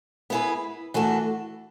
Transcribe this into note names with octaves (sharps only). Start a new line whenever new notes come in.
B3 E4 G#4 B4
E3 A3 D4 F#4 A4